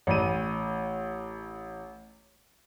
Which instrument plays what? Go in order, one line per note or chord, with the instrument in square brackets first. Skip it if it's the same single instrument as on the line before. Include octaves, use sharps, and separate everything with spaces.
[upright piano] A1 D#7